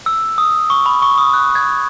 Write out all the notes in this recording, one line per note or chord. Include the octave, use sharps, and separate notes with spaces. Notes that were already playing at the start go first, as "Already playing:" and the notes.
E6
D#6
C#6
B5
C#6
D#6
F#6
G#6